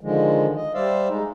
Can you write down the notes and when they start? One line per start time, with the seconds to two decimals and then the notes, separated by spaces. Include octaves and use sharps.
0.01 D3 D#3 F3 G#3
0.56 D#5
0.74 G3 C5 D5 E5 F5
1.09 G#3 D#4